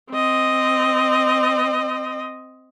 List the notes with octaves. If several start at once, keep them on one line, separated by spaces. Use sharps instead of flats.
C4 D#5